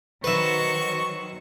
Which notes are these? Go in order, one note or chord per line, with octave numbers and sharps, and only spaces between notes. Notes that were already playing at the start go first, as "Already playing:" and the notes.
D#3 F#3 F#4 B4 C5 E5 C#6